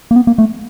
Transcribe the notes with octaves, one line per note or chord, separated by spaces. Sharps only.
A#3
B3
A#3
A3